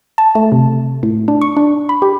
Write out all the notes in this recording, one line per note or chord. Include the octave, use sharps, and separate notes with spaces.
A5
A3
C3
A2
D4
C#6
D4
B5
G4